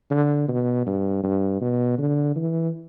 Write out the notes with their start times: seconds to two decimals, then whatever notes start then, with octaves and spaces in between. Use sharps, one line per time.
0.11 D3
0.48 B2
0.86 G2
1.23 G2
1.61 B2
1.98 D3
2.36 E3